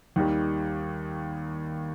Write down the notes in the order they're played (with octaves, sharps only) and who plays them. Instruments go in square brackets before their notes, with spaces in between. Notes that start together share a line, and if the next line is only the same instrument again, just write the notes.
[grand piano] D#2 D#3 G3